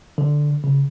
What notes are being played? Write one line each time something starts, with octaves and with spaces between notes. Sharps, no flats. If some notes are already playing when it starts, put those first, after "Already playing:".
D3
C#3